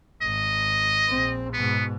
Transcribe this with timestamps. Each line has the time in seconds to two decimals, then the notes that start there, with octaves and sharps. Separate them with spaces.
0.22 G#1 D#5
1.09 A#1 C4
1.53 G#2 B2 B3